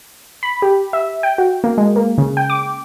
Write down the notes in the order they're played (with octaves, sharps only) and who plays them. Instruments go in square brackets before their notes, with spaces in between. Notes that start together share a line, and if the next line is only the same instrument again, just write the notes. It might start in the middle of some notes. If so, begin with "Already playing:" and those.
[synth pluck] B5
G4
E5
G5
F#4
A#3
G#3
A#3
C#3
G5
D6